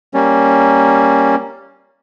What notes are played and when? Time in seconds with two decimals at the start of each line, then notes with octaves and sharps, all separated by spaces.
0.14 G3 A#3 C#4